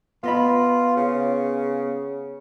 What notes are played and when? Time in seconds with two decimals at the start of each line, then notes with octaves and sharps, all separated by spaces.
0.23 B3 F4 D#5 B5
0.97 C#3